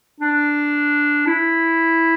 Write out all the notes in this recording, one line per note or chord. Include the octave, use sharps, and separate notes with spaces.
D4
E4